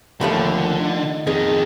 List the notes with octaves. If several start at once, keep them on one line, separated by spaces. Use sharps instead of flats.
D#2 D3 F3 A3 B5
D#4
F2 D#3 G#4